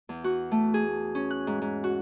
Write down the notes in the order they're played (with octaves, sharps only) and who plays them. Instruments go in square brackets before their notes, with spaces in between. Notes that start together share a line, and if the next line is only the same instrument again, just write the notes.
[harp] E2
F#4
A3
G#4
C#4
F#6
G#2
G#2
F#4